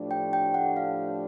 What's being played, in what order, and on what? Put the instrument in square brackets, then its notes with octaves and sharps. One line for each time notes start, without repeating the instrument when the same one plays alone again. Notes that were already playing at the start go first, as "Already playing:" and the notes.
Already playing: [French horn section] A2 F3 A3 D4 G4
[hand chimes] G5
G5
F#5
F5